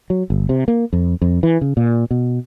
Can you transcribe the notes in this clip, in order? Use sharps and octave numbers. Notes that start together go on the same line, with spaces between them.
F#3
G1
C3
A#3
F2
F2
E3
C#3
A#2
B2